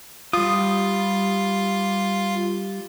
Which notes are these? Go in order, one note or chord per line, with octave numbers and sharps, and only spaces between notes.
G3 F4 D#6